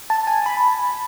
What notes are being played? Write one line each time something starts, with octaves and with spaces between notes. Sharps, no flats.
A5
G#5
B5